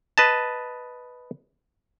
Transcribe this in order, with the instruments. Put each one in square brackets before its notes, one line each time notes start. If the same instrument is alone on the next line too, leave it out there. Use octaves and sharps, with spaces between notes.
[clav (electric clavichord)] B4 D#5 A5